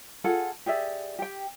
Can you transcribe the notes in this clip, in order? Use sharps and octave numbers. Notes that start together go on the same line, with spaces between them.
F4 G#4 A4 F#5
G4 G#4 D5 E5
G4 G5